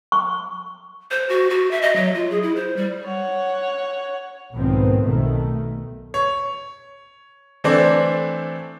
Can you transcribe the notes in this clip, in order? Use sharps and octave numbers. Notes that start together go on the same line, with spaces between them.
C#6
C5
F#4
F#4
E5
D#5
F#3
F4
G#4
E4
C5
G3
C#5 F#5
B1 G#2 D#3 F3 B3 C4
B1 B2 D#3 A3
C#5
E3 A3 C4 D4 C5 D5